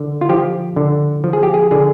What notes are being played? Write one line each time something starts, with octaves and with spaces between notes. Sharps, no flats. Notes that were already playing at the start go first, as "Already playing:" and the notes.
Already playing: D3
F4
F3 G4
D3
F3
G#4
G4
G#4
D3 G#4